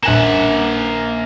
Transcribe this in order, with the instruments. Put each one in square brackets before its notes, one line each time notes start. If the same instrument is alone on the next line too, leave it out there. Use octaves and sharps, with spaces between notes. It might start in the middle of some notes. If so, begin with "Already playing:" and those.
[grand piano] A#1 G#5 E7 [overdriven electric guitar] A#3 F#5